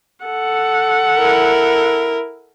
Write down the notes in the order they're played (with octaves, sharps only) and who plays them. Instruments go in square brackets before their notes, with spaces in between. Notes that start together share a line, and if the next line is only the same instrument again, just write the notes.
[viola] A4 F#5
[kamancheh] E4 A#4